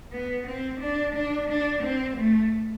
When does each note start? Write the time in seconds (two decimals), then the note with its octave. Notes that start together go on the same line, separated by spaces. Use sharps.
0.12 B3
0.47 C4
0.80 D4
1.15 D4
1.49 D4
1.83 C4
2.17 A3